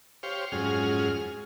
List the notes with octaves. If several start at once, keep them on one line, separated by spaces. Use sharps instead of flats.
G4 C5 C#5 F5
F2 G#2 F#3 C#4 G#4 F6